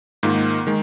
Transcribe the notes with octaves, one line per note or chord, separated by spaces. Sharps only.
G#2 D#3 A#3 F4
D#3 G#3